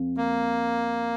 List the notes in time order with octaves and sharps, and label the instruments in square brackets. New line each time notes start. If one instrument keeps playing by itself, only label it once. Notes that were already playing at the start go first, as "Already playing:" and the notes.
Already playing: [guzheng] F2
[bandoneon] A#3